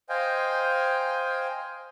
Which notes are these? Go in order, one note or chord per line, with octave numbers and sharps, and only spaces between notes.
C5 D#5 F5 G5 G#5